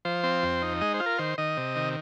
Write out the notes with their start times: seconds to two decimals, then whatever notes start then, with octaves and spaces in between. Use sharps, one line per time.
0.05 F3 C5
0.24 C4
0.43 F2
0.62 D#4
0.81 G#3 D#5
0.94 C5
1.00 F4
1.06 A#4
1.19 D#3 C5
1.38 D#3 D#5
1.57 C3
1.76 D#3